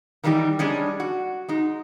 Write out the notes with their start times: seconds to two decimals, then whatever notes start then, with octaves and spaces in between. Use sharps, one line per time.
0.24 D#3 E3 G3 D#4 G4
0.59 G3 G#3 C#4 D4
1.00 F#4
1.48 G#3 D#4